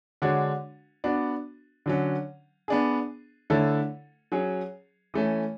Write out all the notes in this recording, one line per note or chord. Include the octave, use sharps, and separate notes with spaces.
D3 G#3 D4 F#4 C#5
B3 D4 F#4
D3 F#3 C#4
B3 D4 G#4
D3 A3 E4 A4 C#5
F#3 C#4 G#4 C#5
E3 A3 C#4